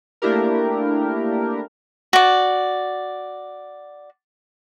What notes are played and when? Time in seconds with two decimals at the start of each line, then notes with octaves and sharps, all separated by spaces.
0.22 A3 A#3 D4 E4 G4 A#4
2.13 F#4 D5